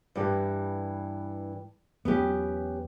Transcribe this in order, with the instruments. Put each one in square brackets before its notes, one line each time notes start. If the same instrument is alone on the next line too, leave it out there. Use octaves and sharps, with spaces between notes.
[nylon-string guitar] G2 E3 G4
[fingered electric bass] E2 F#3 [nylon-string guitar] B3 C#4 G4